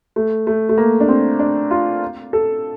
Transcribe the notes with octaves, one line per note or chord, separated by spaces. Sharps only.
A3
A3
A3
A#3
D4
C4
D4
F4
A4